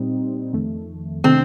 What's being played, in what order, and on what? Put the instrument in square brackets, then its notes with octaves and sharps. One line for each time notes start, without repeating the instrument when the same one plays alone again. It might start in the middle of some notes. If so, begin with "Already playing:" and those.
Already playing: [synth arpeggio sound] A#2 G3 C4 D#4
F2 D#3 A3
[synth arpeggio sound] C3 D#3 A3 D4 [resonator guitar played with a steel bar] C4